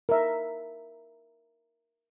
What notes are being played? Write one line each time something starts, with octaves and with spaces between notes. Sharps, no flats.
A#4 E5